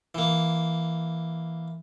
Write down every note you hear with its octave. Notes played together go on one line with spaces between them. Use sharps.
E3 A#3